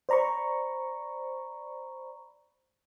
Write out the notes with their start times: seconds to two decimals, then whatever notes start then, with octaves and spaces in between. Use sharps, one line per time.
0.09 C5 D5 A#5 B5 C#6